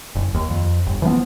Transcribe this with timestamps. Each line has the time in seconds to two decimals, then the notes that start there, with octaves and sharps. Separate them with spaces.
0.15 F#1
0.34 D#2
0.50 F2
0.86 G1
1.02 E3 F3 A3 B3